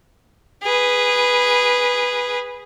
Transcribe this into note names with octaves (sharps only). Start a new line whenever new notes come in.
G#4 B4